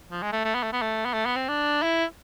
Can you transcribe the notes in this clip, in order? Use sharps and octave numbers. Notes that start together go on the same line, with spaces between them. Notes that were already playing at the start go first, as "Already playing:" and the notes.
F3
G#3
A3
A3
B3
A3
B3
A3
B3
A3
B3
C4
D4
E4